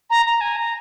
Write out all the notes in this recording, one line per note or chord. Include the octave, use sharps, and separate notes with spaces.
A#5
A#5
G#5
A#5